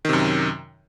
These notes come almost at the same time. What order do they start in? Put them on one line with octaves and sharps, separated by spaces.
D#3 C3 F#2